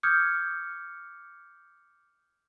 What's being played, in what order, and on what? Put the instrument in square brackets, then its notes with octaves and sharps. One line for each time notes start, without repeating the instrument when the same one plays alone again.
[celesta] D6 D#6 F6 G6 G#6 C#7